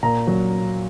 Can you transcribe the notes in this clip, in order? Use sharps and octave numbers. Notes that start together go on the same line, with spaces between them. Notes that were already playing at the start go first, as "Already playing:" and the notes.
A#2 A#5
F#3